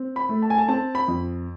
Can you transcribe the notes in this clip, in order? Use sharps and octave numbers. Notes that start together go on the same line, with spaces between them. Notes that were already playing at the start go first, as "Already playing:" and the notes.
Already playing: C4
B5
A3
A5
G#5
A5
C4 A5
B5
F2